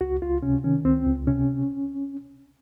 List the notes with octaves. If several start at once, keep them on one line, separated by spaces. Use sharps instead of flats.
C#2 F#4
C#2 F4
C3 C#4
D#3 C#4
C#2 C4
C#2
C3 C#4